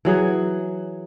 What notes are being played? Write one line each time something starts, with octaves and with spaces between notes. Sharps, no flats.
E3 F#3 G#4